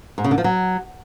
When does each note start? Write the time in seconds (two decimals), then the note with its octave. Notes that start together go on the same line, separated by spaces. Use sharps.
0.18 G#2
0.24 C#3
0.31 D3
0.38 F3
0.44 F#3